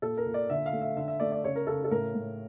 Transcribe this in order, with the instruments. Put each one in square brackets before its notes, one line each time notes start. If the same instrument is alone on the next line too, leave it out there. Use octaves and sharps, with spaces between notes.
[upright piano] A#2 A4
A#4
A#2
D5
D3 E5
F5
A3
E5
D3 E5
E5
A3 D5
D5
C#3 C#5
A#4
C#3 A4
A4
A2 A#4
A2